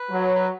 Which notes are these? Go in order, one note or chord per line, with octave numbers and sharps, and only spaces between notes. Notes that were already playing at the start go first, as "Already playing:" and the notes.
Already playing: B4
F#3
B4